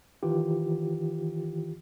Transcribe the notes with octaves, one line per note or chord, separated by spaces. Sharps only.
D#3 E3 F4 G4